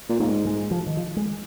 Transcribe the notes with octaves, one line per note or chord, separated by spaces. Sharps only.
A#2
G#2 A#3
G#3
F3
D#3
F3
G#3